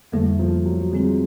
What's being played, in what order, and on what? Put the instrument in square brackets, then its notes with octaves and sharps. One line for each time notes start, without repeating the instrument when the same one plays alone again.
[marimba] F2 D3 G3 A#3 [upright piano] A3
[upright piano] F3
F#3
[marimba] D3 G3 C4 F4 G#4 [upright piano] G#3